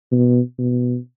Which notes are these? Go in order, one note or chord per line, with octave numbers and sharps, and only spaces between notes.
B2
B2